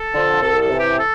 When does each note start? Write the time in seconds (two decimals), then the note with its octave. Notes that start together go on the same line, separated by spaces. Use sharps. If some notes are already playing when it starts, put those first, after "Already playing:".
Already playing: A4
0.13 D3 F3
0.41 C2 A4
0.61 A4
0.70 C3 E3
0.79 G4
0.98 A4